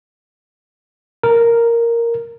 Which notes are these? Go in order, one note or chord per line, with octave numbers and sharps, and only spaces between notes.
A#4